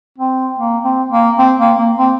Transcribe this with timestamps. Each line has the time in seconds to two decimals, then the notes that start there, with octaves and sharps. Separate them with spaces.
0.18 C4
0.58 A#3
0.84 C4
1.12 A#3
1.38 C4
1.59 A#3
1.78 A#3
1.98 C4